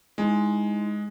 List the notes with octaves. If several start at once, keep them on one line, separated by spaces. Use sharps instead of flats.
G#3 D#4 E4 C6